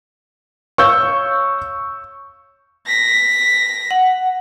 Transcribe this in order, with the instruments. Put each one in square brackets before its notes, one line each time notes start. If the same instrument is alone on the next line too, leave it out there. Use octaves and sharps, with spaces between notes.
[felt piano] C#5 F5 [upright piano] C#6 E6 G6
[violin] A#6 B6
[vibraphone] F#5